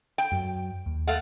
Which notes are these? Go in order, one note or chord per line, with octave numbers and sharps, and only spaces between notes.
G5
F#2 F#3
D#2
A3 F5 F#5